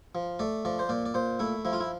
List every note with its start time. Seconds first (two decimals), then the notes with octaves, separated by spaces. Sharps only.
0.15 F3
0.39 A3 D5
0.65 F3 D5
0.79 C5
0.89 A#2 D5
1.06 D5
1.14 A#2 C5
1.39 A3 E4
1.65 F3 E4
1.73 F4
1.80 E4